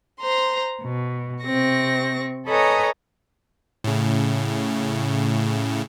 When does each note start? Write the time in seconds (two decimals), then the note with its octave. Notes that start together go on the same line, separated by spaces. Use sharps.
0.21 C5 A#5 C6
0.81 B2
1.43 C3 C4 C#6 A#6
2.46 A4 B4 C#5 D#5 G#5 A#5
3.84 A2 C#3